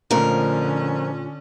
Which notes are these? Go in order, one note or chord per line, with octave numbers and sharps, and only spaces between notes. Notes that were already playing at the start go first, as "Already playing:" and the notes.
F2 A#2 D3 F3 A3 C#4 F4 A#4